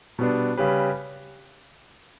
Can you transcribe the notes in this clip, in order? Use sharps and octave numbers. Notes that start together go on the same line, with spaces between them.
B2 G3 B3 D4
C#3 G3 C#4 G4 B4